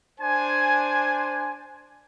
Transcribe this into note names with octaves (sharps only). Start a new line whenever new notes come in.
D4 C5 G#5